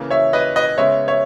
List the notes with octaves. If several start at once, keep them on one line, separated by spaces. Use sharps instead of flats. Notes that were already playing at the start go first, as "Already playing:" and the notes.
Already playing: C#3 E3 A#3
C#5 E5
B4 D#5
B4 D#5
C#3 G#3 B3 C#5 E5
C#5 E5